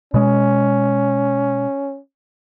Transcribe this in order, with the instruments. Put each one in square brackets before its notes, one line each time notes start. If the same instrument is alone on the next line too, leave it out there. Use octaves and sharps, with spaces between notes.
[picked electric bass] B2 G#3 [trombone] C#4